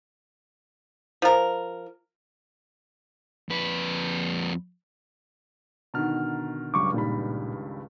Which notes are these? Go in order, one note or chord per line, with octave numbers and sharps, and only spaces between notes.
F3 A#4
F2 B4
B2 D3 D#3 A#5 F6
C#2 G2 F#3 C#6 D6
A#2 D#3 G3 B5